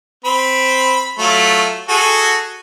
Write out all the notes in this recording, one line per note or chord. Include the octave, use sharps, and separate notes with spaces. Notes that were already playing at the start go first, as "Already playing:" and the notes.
C4 B5
F#3 A3 F4
F#4 G#4 A4